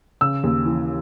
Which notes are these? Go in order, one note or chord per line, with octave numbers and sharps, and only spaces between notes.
C#3 E6
D#2
E3